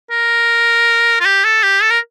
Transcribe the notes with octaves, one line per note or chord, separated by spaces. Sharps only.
A#4
F4
G4
A4
G4
A4
A#4